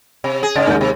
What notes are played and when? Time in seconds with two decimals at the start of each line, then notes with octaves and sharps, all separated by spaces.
0.24 C3
0.43 G#4
0.56 G#2 C#3 D#5 A6 D7
0.67 D#2 G#3 G6
0.81 C3